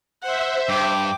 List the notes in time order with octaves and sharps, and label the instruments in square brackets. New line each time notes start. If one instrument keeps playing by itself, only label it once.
[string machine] C5 E5 [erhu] F#5
[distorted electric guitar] G2 [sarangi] G5 [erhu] D6